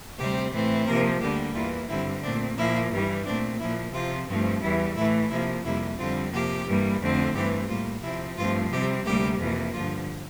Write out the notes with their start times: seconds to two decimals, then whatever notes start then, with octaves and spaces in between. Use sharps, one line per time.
0.18 D2 C3 G3 C4 G4
0.52 A2 E3 A3 C4
0.86 C3 F3 A#3 A#4
1.20 D2 D3 G3 A#3 G4
1.54 E2 E3 A#3 F4
1.89 G2 D3 G3 C4 E4
2.22 A#2 A3 C4 D4
2.57 A#2 F3 A#3 E4
2.92 G2 E3 G3
3.25 A#2 A3 C4 D4
3.59 A#2 F3 A#3 E4
3.93 C3 F3 C4 F4
4.28 G2 F3 A3 C4
4.62 E2 E3 G3 E4
4.95 A2 E3 A3 E4
5.30 C3 F3 A#3 E4
5.64 F2 C3 G3 A#3 E4
5.98 F2 D3 G3 C4 F4
6.32 C3 F3 A#3 G4
6.66 G2 E3 G3 A#3
7.01 F2 D3 A3 C4
7.35 G2 E3 A3 C4 G4
7.68 A2 G3 A#3 F4
8.02 C3 F3 C4 E4
8.37 G2 F3 A3 C4 F4
8.71 C3 G3 C4 G4
9.05 D2 C3 G3 A#3 G4
9.39 F2 C3 E3 A#3
9.73 G2 D3 F3 F4